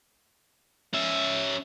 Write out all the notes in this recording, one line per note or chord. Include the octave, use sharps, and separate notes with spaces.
C#4 E5